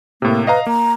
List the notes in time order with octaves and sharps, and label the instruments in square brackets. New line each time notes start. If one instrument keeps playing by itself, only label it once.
[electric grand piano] A2 C3 [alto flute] A#3
[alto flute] B4 [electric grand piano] D#5 F5 A#5
[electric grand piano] A#3 [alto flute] A#5